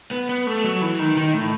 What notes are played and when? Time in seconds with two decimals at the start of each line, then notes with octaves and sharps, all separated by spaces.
0.11 B3
0.29 B3
0.47 A3
0.64 F#3
0.82 E3
0.99 D#3
1.17 D#3
1.34 A2